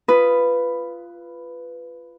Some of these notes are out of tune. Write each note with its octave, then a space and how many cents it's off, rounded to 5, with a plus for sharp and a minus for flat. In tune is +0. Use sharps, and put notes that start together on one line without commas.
F4 -15 B4 +5 D#6 +0